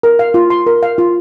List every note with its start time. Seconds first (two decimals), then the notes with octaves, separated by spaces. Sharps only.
0.03 A#4
0.19 F5
0.34 F4
0.50 C6
0.67 A#4
0.83 F5
0.98 F4